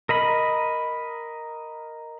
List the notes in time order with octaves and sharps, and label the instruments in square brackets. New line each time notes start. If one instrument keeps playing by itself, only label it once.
[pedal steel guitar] A#4 D#5 B5